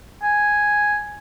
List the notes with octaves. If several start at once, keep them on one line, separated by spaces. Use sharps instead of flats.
G#5